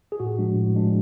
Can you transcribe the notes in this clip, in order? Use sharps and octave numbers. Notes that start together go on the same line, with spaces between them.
G#4
A2 F#4
F3 G#3 D4
A2
F3 G#3 D4